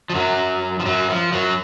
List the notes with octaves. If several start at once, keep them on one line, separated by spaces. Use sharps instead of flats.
F3
F#2 F#3
F3
F#2 F#3
F3
F#2 F#3